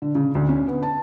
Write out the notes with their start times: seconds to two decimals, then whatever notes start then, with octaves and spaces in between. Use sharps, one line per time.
0.02 D3
0.15 C#3
0.35 D2
0.49 C#4
0.68 B3
0.83 A5